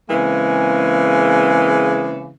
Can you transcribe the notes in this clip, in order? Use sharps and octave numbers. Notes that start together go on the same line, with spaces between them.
C#3 E3 G#3 A#3 C4